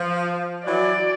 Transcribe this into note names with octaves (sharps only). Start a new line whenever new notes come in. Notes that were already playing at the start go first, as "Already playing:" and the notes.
Already playing: F3
E3 F#3 D5